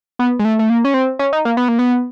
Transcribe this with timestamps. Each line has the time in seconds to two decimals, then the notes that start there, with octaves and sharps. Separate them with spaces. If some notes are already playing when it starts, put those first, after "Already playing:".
0.19 B3
0.39 G#3
0.45 A3
0.59 A3
0.70 A#3
0.84 C#4
0.94 C4
1.19 C#4
1.33 D#4
1.45 A#3
1.57 B3
1.68 A#3
1.79 B3